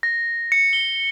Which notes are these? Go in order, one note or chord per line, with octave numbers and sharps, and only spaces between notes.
A#6
C#7
G7